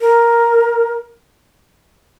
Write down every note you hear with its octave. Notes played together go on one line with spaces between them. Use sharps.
A#4